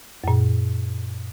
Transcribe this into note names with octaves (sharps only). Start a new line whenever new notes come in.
F#2 A#2